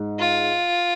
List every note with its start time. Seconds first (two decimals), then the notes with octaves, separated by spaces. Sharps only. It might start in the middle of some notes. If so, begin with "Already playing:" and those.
Already playing: G#2
0.19 F4